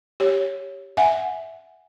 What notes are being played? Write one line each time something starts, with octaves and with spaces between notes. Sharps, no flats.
G4 C#5
E5 F#5 G#5